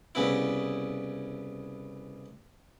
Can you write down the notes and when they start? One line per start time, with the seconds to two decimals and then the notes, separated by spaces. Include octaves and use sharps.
0.15 C2 C#3 B3 E4